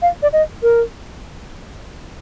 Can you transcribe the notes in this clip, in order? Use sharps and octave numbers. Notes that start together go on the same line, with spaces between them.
F5
D5
D#5
A#4